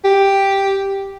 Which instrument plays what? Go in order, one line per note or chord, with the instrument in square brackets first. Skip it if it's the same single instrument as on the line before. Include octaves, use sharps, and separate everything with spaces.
[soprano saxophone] G4